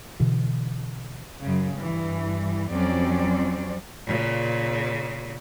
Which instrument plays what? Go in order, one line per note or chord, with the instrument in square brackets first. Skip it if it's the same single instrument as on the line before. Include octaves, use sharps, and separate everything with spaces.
[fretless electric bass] B2 D3 E3
[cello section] F#2 C#3
G2 E3
F2 F#3 C4 C#4 C5 D5
[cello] A#2 C#3